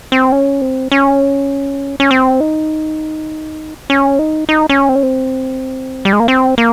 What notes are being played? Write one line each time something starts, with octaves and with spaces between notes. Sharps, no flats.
C4
C#4
C4
C#4
C#4
C4
D#4
C#4
D#4
D#4
C#4
C4
C#4
C4
G3
G#3
A#3
C4
A#3